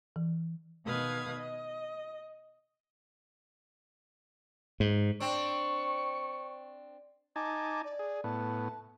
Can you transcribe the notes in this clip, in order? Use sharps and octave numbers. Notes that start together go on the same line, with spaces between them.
E3
B2 D#3 B4 F5 D#6 G#6
D#5
G#2
C4 D4 C#6
D#4 G#5 A5 D6
D5
G#4
A2 B3 A5